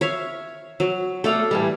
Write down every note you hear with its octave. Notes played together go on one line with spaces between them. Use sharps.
C#5 E5 F5
F#3
A3 A4 D5 F5
A2 E3 G3